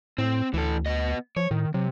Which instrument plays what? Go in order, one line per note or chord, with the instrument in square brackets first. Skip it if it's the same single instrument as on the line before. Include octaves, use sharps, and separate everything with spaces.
[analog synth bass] A2 [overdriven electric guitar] C4
[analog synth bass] D2 [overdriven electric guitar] E3 A4
[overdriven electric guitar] B3 D#5
[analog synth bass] F3 [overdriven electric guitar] C#5
[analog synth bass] A2 [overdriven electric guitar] D#3
[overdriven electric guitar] C3 [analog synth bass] F#3